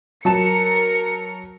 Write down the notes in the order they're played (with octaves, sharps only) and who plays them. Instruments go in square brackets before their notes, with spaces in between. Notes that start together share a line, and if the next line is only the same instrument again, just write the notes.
[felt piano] F#3 A5 E7 [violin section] A#4 C#7